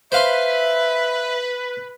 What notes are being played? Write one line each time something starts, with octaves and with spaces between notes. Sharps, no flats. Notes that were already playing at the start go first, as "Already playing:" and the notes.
B4 C5 E5 F5 C6